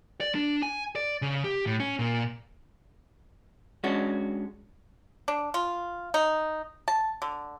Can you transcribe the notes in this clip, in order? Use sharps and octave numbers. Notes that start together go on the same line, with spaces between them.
D5
D4
G#5
D5
C#3
G4
A2
C#4
A#2
G#3 C#4 D4 F#4
D4
F4
D#4
A5
D3